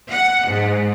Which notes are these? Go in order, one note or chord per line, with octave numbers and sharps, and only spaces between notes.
F#5
G#2